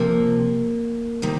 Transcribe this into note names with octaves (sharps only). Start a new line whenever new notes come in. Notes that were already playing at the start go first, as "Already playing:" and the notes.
Already playing: C3 F3 A#3
C3 D#3 G3